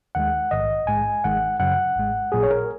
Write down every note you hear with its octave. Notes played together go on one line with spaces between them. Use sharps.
D#2 D#3 G#3 F#5
A#1 G#2 D#3 D#5
A#1 G#2 G#3 G#5
G#1 G#2 D#3 G#3 F#5
F#2 C#3 F#3 F#5
G#1 G#2 G#3
A#1 A#2 F#3 G#4
C#5
A#4